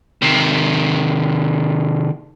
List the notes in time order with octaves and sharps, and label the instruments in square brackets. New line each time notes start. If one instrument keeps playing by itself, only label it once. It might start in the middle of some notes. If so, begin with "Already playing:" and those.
[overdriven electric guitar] C3 D#3